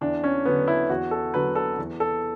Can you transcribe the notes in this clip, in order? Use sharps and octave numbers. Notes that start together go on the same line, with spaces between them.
E2 D4
C#4
D3 F#3 B3
E4
E2 F#4
A4
D3 F#3 B4
A4
E2
A4